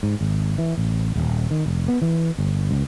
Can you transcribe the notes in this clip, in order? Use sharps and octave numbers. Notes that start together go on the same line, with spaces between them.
G#2
G#1
E3
A1
D#1
D#3
F1
B3
E3
G1
C#2